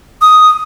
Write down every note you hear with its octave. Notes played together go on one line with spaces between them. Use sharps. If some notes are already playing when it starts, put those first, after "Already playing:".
D#6